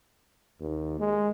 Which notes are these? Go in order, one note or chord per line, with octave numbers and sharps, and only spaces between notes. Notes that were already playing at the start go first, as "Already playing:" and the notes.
D#2
G#3